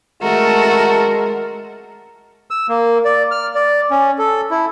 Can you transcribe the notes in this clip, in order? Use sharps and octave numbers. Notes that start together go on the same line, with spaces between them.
G#3 A3 F#4 A#4 A5
E6
A#3
D5
F6
D5
C#4
A4
E4